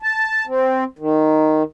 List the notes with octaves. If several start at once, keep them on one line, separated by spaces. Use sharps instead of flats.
A5
C4
D#3